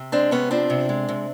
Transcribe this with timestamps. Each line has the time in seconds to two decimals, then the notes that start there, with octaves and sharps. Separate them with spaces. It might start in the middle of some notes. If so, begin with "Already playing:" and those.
Already playing: C3
0.12 G#3 C4 D4
0.31 C3 B3 C#4
0.51 F3 C4 D4
0.70 C3
0.89 G#3
1.09 C3